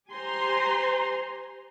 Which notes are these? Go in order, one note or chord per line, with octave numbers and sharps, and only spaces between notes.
G4 C5 G#5 A#5 C6